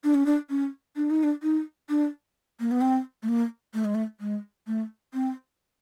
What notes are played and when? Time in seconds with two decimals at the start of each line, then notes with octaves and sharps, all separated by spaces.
0.04 D4
0.15 C#4
0.26 D4
0.50 C#4
0.96 D4
1.10 D#4
1.23 D4
1.43 D#4
1.90 D4
2.60 A#3
2.71 B3
2.81 C4
3.23 A3
3.29 A#3
3.74 A3
3.85 G#3
3.95 A3
4.21 G#3
4.67 A3
5.14 C4